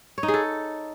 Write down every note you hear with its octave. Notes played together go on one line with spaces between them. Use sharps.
C#5
D#4
G#4
A4